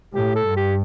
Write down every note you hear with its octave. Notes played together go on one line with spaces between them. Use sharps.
A2 G4
A4
G2
G4